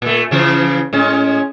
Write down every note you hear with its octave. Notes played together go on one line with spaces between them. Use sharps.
A#2 A3
C#3 E3 F3
A2 G#3 C#4